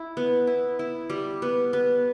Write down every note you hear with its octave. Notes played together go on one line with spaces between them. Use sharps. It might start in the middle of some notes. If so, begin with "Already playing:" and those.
Already playing: E4
B3
E4
E4
G3
B3
B3